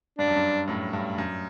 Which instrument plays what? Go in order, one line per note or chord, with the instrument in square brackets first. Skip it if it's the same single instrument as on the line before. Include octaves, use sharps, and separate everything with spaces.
[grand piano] G2 [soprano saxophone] D4
[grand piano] F#2
G2
F#2 A2
G2
F#2